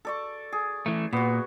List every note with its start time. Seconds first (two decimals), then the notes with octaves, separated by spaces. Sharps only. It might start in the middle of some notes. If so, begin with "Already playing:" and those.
0.05 A4 D5 C#6
0.53 G#4
0.86 E3 A3
1.13 A#2 B3 F#4